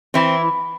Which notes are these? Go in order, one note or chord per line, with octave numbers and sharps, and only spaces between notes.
E3 C4 E4